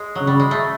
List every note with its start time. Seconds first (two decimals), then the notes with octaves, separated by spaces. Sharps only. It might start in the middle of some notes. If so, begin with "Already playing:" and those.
Already playing: G#3
0.15 F#3
0.21 C#3
0.27 G3
0.40 G#3
0.51 A3